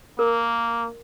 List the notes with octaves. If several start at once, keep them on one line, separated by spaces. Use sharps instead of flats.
A#3 A#4